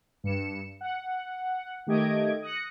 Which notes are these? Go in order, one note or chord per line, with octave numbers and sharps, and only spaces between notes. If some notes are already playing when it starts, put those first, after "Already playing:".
G2 C#7 E7
F#5
D#3 A3 G4 D#5 G#6 D7
D#6 F#6 A#6 C#7